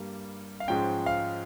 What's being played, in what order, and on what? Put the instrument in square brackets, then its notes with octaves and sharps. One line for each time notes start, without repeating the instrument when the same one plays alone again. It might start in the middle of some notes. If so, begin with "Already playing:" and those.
Already playing: [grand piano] G2 G3 A#3
F5
G#2 F3 G#3 C#4 G5
F5